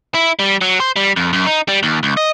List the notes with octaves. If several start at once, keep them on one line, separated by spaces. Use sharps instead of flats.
E4
G3
F#3
C5
G3
F2
F#2
D#4
G3
D#2
C#2
D#5